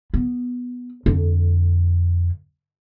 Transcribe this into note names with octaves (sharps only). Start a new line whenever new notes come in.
B3
F2 D3